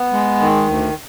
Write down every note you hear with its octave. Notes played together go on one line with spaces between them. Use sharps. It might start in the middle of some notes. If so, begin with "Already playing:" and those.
Already playing: B3
G#3
D#3
D2